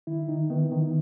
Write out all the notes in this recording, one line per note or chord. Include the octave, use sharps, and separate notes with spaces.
D#3 E4
D#3 D#4
D#3 B3
D#3